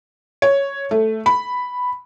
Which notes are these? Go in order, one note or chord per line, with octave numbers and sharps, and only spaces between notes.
C#5
A3
B5